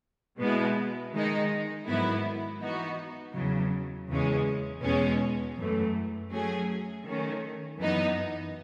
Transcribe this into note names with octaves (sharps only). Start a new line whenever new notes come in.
B2 G#3 B3 E4
D#3 G#3 D#4
G#2 D#3 F#3 B3 E4
E3 B3 D#4 F#4
E2 C#3 F#3
E2 C#3 E3 G#3 C#4
E2 B2 G#3 C#4
F#2 E3 A3
F#3 A3 C#4 G#4
D#3 A3 C#4
F#2 E3 B3 D#4